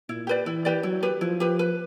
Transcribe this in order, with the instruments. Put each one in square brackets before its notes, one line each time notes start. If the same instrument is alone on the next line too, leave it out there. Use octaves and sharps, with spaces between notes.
[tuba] A#2 [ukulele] E4
[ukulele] G4 B4 D5
[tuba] E3 [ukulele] E4
[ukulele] G4 B4 D5
[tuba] F#3 [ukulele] E4
[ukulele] G4 B4
[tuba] F3 [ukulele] E4
[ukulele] G4 B4
B4